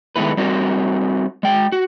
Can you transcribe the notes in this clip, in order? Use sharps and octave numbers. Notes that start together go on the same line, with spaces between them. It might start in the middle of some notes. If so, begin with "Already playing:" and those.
D#3 G#3 A3 B3 E4 B4
G3 C4 F#4 A#4
G#3 G5
F#4